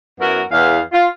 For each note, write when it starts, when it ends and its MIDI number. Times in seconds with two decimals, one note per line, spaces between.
0.20 0.41 42
0.20 0.41 59
0.20 0.41 64
0.20 0.41 66
0.20 0.41 70
0.51 0.79 40
0.51 0.79 77
0.93 1.07 65